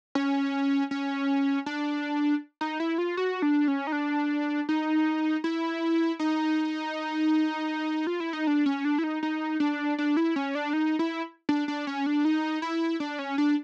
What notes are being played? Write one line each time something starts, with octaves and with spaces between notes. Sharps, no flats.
C#4
C#4
D4
D#4
E4
F4
F#4
D4
C#4
D#4
D4
D#4
E4
D#4
F4
E4
D#4
D4
C#4
D4
E4
D#4
D#4
D4
D4
E4
C#4
D4
D#4
E4
D4
D4
C#4
D4
D#4
E4
D4
C#4
D4